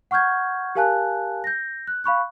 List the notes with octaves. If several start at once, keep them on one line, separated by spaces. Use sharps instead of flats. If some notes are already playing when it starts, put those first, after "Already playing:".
F#5 C#6 F6 G6 G#6
G4 A#4 F5 G#5 A5 F#6
G6 A#6
F#6
F5 B5 C#6 F#6